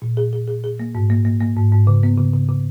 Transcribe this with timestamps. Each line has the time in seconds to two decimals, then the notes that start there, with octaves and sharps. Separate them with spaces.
0.02 A#2
0.17 G#4
0.33 G#4
0.48 G#4
0.64 G#4
0.80 A#3
0.95 G#2
1.10 A#3
1.25 A#3
1.40 A#3
1.57 G#2
1.72 G#2
1.87 C#3
2.03 B3
2.18 C#3
2.33 C#3
2.49 C#3